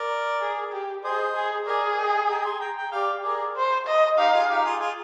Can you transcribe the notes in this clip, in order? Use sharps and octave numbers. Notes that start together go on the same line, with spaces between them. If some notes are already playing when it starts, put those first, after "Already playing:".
Already playing: A#4 D5
G#4
G4
G#4 C5 D#5
G#4
G#4 A#4 D5
D#5 G5
G5 A#5
A#5
G#5 C6
G5 A#5
G5 A#5
G4 D5 F5
G#4 A#4 D5
C5
D#5
D#4 G4 F5
F4 G#4
D#4 G4
F4 G#4
F4 G#4